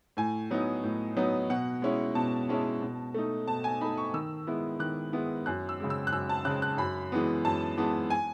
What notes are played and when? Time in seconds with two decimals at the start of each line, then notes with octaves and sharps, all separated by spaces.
0.17 A2 G#5
0.51 F#3 B3 D#4
0.83 A2
1.17 F#3 B3 D#4
1.50 B2 F#5
1.82 G#3 C#4 E4
2.15 B2 A5
2.49 G#3 C#4 E4
2.82 B2
3.14 A3 D#4
3.47 B2 A5
3.64 G#5
3.81 A3 D#4 B5
3.98 C#6
4.14 D#3 E6
4.47 G#3 B3 E4
4.80 D#3 F#6
5.13 G#3 B3 E4
5.46 F#2 F#6
5.69 E6
5.80 C#3 G#3
5.90 E6
6.07 F#6
6.12 F#2 E6
6.29 A5
6.45 C#3 G#3 F#6
6.62 F#6
6.78 F#2 B5
7.12 E3 G#3 B3
7.44 F#2 A5
7.77 E3 G#3 B3
8.10 G#5